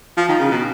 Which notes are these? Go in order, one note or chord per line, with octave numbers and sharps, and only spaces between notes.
F3
D#3
C#3
B2